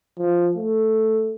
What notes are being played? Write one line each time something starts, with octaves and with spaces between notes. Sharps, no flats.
F3
A3